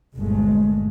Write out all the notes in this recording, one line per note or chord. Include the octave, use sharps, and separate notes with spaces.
G1 D2 A#2 G#3 A3